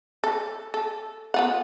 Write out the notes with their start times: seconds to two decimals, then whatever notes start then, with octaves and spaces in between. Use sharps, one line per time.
0.24 A4
0.74 A4
1.34 B3 F4 F#5